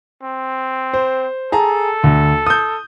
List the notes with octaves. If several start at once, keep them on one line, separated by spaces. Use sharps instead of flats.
C4
C5
G#4 A4 A5 A#5
D2
D#6 G6